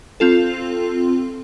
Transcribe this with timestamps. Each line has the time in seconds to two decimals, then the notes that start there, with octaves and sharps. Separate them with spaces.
0.20 C4 F4 A4